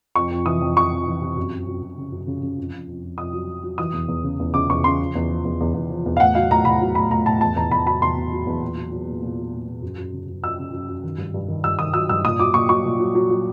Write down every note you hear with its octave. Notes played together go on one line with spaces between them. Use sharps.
F2 C#6
F2
E3 D#6
F2
F2 C#6
F2
E3
C3
F#2
F#2
F#2
F#2
C#3
F#2
C#3
C#3
F2
F2
F2
F2
F2 D#6
F#3
F#3
F#3
E3 D#6
E2
E2
C#3
E2
C#3 D6
E2 C#6
C#3 C6
F3
E2
F3
E2
E2
E2
F3
E2
F5
A2 F#5
F#3 F5
A2 A#5
A2 B5
F#3
A2 B5
A2 A#5
A2 A5
E2 A5
E2 A#5
E2 B5
F#3 B5
E2 C6
B2
F#3
E2
A#2
F#3
F#3
A#2
A#2
F#3
A#2
A#2
F#2
F#2
C#3
F#2
F#2 E6
C#3
F#2
F#2
D#3
G2
G2
D#3
G2 E6
D#3 D#6
F#3 E6
G2 E6
A#2 D#6
F#3 D6
A#2 C#6
F#3 C#6
A#2
F#3
F#3
F#3